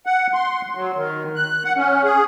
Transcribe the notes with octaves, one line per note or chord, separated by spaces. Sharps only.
F#5
C6
F#3
D#3
F#6
F#5
C#4
G#4